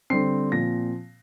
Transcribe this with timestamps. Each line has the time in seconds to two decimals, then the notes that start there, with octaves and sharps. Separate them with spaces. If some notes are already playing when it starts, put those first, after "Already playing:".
0.10 D3 G3 C4 C7
0.52 A#2 F3 C4 A#6